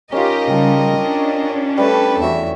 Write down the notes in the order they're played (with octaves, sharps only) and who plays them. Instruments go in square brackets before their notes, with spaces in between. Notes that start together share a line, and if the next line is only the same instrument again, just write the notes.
[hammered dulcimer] C#4 D#4 F4 [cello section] G4 [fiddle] A#4 D#5
[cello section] C#3 G3 [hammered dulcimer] G4 A5
[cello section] C#4 D4
[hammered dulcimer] G3 A3 [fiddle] A4 B4
[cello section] E2 [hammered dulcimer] F#4 C#5 [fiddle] E5